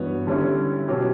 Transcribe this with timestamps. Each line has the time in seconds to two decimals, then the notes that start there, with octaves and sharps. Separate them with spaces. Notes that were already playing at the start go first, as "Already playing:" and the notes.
Already playing: G2 E3 B3 F#4 C#5
0.27 D3 G3 C#4 E4
0.88 B2 F#3 C#4 G4